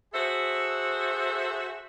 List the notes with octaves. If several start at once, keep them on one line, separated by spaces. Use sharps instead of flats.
F#4 G#4 A4 C5 E5